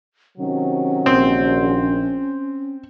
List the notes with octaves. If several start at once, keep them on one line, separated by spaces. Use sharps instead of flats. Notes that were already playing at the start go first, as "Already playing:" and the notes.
C3 D#3 F#3 C#4
A#1 C4